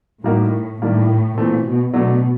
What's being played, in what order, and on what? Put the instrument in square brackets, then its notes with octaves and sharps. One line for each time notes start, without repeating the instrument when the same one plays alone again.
[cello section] A2 [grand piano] G3 A#3 D#4 F#4 A#4
[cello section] A2 [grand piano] D#3 G3 A#3 D4
[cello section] A#2 [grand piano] E3 A3 C4
[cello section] B2
[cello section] B2 [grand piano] F#3 A3 D4